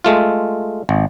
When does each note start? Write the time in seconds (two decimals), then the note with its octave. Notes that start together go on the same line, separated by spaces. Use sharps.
0.04 G#3 A3 F4
0.89 G#1